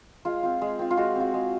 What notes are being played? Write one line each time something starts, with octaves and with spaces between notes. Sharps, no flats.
G#3 F4
C4 F4
G#3
C4 F4
F4
G#3 F#4
C4 F4
G#3